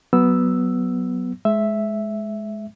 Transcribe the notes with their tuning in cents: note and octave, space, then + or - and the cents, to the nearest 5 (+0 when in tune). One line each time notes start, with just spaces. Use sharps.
F#3 +0 B3 +0 E6 +0
G#3 +20 E5 +0